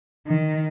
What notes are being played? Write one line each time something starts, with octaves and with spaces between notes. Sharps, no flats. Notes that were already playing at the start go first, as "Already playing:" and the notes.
D#3